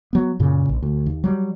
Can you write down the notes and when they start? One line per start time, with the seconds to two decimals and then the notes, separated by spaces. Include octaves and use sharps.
0.13 F#3 B3
0.39 F#2 A#2 C#3
0.69 A#1
0.82 D2
1.06 D#2
1.24 F#3 G3